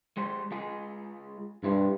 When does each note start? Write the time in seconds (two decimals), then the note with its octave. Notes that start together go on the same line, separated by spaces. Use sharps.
0.17 G#3 G4 C5
0.52 G#3 F4 G#4
1.63 B1 G2 E4 C5